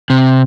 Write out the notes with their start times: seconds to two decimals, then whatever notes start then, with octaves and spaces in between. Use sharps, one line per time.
0.10 C3